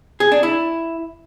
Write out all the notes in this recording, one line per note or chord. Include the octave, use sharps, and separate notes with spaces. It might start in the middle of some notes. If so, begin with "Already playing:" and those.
G#4
D4
E4